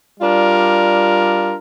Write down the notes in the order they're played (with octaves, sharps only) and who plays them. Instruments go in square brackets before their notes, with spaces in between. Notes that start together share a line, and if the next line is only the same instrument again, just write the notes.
[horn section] G3 D4 F4 A#4